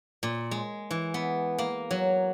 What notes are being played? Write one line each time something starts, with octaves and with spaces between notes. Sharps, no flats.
A#2
G#3
E3
B3
A#3
F#3